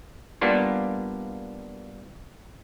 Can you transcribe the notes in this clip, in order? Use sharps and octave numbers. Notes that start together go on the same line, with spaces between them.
G3 A#3 B3 D4 F4